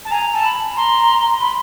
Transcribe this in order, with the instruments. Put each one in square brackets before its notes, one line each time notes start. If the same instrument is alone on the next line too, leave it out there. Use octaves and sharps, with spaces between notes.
[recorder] A5
[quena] G#5 [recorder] A#5
[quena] A5
[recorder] B5
[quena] A#5 [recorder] C6
[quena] B5